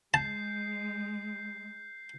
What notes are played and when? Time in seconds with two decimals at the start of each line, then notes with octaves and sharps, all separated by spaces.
0.14 G#3 A5 G6 C7